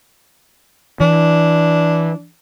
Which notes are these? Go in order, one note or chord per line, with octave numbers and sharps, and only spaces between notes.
E3 D4